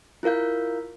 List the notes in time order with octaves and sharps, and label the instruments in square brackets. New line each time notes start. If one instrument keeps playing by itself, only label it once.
[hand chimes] E4 F4 A#4 F5 G6